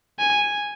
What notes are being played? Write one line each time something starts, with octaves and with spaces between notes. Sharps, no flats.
G#5